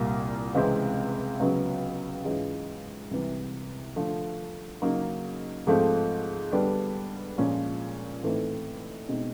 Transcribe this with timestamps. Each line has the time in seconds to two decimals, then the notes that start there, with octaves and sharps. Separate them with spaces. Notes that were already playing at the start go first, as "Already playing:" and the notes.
Already playing: C2 A#2 G3 A#3
0.55 C#2 C3 E3 G#3 C4
1.40 C#2 C#3 F#3 B3
2.25 G#2 E3 G#3 C#4 F4
3.11 C2 C3 E3
3.96 D3 F3 A3
4.82 C#3 F#3 A#3 D#4
5.67 G#2 F3 A3 C4
6.52 D3 G3 B3 D4
7.38 A#2 F3 G#3 C#4
8.23 A2 E3 A3 C4 D#4
9.09 B2 G#3 C4 D#4